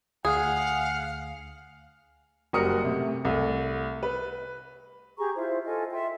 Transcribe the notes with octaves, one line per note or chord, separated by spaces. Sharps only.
D2 G#4 F5 F#5
F#1 G3 F#4 A#4 D#6 C#7
A2 C3
C2 A3
B4
G4 G#4 A#5 C#6
E4 F4 C5 E5
F4 A4 D#5 G#5
E5 G5 C6